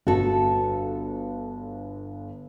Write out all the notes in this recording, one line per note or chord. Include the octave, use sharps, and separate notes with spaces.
G1 F#4 A4